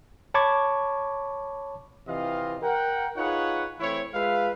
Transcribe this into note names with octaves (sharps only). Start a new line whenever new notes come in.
C#5 A5 B5 C#6 D6 G#6
C3 E3 C4 F4 D#5 F5
A#4 F#5 G5
D#4 F4 G#4 B4 C#5 F#5
E3 A3 C4 E4 C#5
G#3 F4 B4 E5 F5